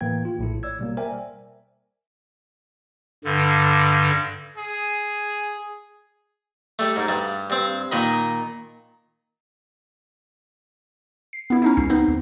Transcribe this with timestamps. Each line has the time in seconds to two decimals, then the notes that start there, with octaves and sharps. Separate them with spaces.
0.01 A2 E3 A#3 G5 G#6
0.25 F4
0.39 A#1 A2 E4
0.63 C#5 D5 E6 G#6
0.79 B2 G3 A#3
0.97 A#4 C5 D5 E5 G5 G#5
3.24 G2 D3
4.56 G#4
6.79 G3 A3
6.96 G#2
7.09 G2 G3
7.50 G2 C4
7.91 A#2 D#3 A#4 D#5 B5
11.33 C7
11.50 B3 E4
11.62 C#4 D#4 E4
11.77 C#2 C7
11.90 B3 C4 D#4
12.08 D2